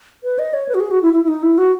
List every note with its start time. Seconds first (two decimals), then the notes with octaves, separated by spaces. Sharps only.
0.24 B4
0.39 D#5
0.54 C#5
0.69 B4
0.74 F#4
0.80 G#4
0.91 F#4
1.02 E4
1.13 E4
1.24 E4
1.28 D#4
1.43 E4
1.58 F#4